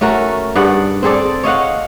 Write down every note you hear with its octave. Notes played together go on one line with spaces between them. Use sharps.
A3 C#4 F#4 A#4
G2 G#4 D5 F#5
C4 G#4 A4 D5
C#5 D#5 F5 F#5